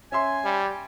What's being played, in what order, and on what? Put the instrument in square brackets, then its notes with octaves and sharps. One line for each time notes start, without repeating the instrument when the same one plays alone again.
[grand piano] C#4 E5 C6 [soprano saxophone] G#5
[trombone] G3